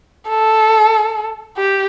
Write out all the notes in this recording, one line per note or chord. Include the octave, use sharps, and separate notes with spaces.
A4
G4